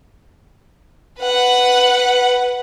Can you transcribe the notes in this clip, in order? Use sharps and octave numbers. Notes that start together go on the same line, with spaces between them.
B4 F#5